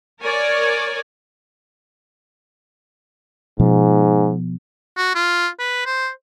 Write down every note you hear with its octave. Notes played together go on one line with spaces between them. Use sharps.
A#4 C#5 D5 G#5
G#2 B2 F3
F#4
F4
B4
C5